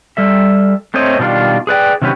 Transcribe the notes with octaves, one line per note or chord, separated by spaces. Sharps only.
G3 A4 E5
A3 C4 C5 C#5 D#5
B2 D#3 G3 D4 F4
G#4 B4 D5 G5
C3 D#3 F#3 C#4 G4 B4